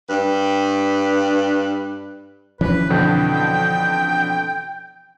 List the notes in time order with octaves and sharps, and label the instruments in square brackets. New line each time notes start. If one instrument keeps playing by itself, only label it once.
[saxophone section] G2 G3 B4
[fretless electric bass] E3 F3 C#4 [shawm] B4
[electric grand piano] F2 B2 D3 [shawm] G5